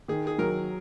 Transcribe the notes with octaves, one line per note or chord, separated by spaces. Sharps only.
D#3 G#4
G#4
F#3 A#4